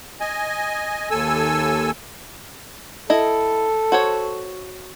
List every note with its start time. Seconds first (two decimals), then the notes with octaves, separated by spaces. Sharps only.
0.21 D#5 G#5
1.11 D#2 A4 G#5 E6
3.10 E4 A4 D#5
3.92 F#4 C5 C#5